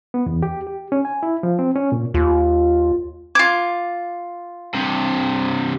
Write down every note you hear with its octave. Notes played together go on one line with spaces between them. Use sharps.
B3
E2
G4
G4
C#4
G#5
E4
F3
C4
C#4
A#2
D#2 F4
F4 D6 G#6
G2 C3